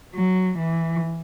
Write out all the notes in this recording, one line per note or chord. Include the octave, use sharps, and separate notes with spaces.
F#3
E3